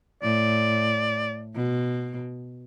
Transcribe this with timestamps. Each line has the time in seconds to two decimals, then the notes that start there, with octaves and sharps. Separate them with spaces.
0.23 A2 D5
1.55 B2